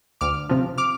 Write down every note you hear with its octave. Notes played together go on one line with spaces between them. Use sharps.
D2 D6 F6
C3 F3
D6 F6